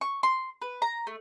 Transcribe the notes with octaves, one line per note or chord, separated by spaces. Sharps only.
C#6
C6
B4
A#5
A3